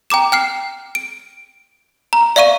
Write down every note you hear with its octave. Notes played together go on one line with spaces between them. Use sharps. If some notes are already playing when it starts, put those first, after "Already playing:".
G5 A#5 D6 E7
G5 F6 C7
D7
A#5
D5 E5 F5 C#6 D#7